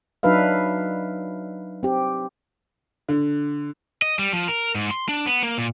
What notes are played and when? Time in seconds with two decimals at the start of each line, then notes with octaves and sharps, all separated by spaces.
0.23 F#3 D4 D#4 B4 E5 F5
1.83 C4 G4
3.09 D3
4.02 D#5
4.19 G3
4.33 F3
4.48 A#4
4.75 G#2
4.91 C6
5.09 D4
5.26 B3
5.43 A#3
5.58 A#2